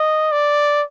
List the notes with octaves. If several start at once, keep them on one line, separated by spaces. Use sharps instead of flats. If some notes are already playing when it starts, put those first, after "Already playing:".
Already playing: D#5
D5